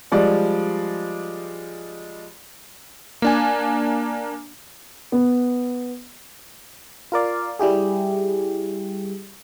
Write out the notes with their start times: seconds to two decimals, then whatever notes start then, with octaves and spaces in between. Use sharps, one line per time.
0.12 F3 G3 G#3 D5
3.22 A#3 D4 G#5
5.12 B3
7.12 F4 A#4 D5 F5
7.59 G3 E4 G4 G#4